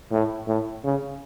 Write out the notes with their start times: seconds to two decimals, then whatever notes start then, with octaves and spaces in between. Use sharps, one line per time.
0.12 A2
0.48 A2
0.84 C#3